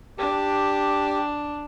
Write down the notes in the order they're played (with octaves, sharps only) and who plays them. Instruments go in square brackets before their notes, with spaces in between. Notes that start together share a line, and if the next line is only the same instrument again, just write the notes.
[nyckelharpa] D4 [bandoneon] G4